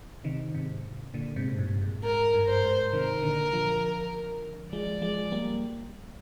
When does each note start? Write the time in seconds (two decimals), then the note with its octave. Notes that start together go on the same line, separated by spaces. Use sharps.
0.24 C3 D#3
0.54 G#2 C3
1.14 A#2 D3
1.36 G#2 C3
1.59 G2 A#2
1.81 G#2
2.03 G#2 A#4
2.34 G2
2.48 C5
2.63 G#2
2.93 C3 D#3 A#4
3.22 A#2 D3
3.53 D3 F3
4.72 F3 G#3 D5
5.02 F3 G#3
5.32 G3 A#3